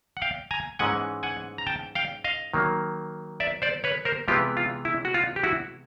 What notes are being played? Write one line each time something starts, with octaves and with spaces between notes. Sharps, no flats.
F#5
F5 G5
G#5 A#5
G#2 E3 G#3 C#4 F#5 G#5
F#5 G#5
A#5
G5 A5
F5 G5
D#5 F5
D#3 F#3 A#3
D5 E5
C5 D5
B4 C#5
A#4 C5
C3 E3 G#3 B3 F4 G4
F4
E4
F#4
F4
G4
E4 F#4